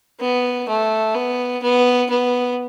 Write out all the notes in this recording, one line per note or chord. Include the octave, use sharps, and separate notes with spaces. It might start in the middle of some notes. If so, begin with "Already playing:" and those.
B3
A3
B3
B3
B3